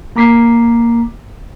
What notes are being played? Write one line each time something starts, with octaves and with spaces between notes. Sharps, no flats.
A#3 A#5 D6 B6 C7